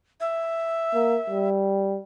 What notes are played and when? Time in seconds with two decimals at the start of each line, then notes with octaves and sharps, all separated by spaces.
0.21 E5
0.94 A#3
1.30 G3